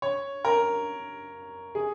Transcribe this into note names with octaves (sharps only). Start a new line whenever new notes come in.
C#5
A#4
G#4